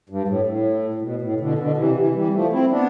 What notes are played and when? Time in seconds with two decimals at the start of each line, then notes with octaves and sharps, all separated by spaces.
0.10 G2
0.28 A2
0.47 A2
0.95 A2
1.02 B2
1.21 A2
1.40 B2 D3
1.59 B2 D3
1.77 C3 E3
1.96 C3 E3
2.15 E3 G3
2.34 F3 A3
2.53 C4 E4
2.71 B3 D4